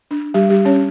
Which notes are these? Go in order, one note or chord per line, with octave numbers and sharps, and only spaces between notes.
D4
G3 G4
G3 G4
C#4 C#5